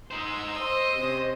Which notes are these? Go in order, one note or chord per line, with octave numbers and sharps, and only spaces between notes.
D#4 C5 C6 E6
C5 D#5
C3 C#4